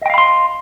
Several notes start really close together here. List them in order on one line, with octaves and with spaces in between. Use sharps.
D#5 G5 F5 B5 C6